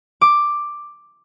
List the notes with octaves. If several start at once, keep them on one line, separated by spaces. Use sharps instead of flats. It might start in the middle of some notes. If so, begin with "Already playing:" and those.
D6